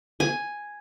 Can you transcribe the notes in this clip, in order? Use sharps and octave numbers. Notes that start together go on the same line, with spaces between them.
G#5